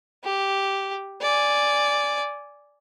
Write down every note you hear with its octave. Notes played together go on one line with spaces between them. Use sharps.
G4
D5 G#5